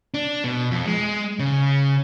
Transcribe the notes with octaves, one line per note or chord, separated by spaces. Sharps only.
D4
B2
F2
G#3
C#3